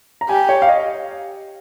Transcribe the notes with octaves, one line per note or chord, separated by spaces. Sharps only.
A#5
G4 G#5
C#5
F5
D#5